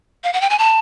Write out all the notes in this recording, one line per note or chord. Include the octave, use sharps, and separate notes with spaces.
F5
F#5
G5
G#5
A5